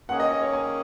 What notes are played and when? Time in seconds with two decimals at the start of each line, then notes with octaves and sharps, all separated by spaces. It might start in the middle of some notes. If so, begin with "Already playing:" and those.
0.09 D#3 A#3 C#4 G#4 F#5
0.20 D#5
0.31 D#5
0.42 C#5
0.53 G#5